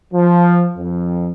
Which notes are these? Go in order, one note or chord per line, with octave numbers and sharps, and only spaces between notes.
F3
F2